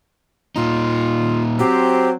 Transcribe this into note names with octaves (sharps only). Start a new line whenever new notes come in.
A#2 D#4 F4
F#3 C4 G4